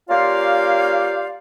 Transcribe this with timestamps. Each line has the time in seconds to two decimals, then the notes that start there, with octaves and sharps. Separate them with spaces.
0.09 A#3 C#4 F4 G4 D5 F5